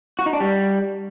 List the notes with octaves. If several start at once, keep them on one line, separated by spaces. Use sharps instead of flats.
F#4
D#4
D4
G3